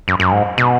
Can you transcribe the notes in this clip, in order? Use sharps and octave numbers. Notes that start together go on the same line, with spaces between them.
F#2
F#2
G#2
B2